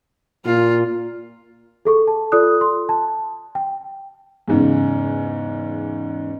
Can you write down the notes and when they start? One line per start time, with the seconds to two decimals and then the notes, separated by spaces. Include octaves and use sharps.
0.46 A#2 F4
1.85 G#4 A4 C#6
2.08 A5
2.32 F4 A4 D5 D#6 F#6
2.61 C6
2.89 A5
3.55 G5
4.48 E2 G#2 C#3